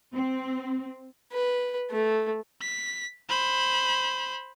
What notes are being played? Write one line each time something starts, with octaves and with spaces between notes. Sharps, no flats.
C4
B4
A3
B6
C5 B5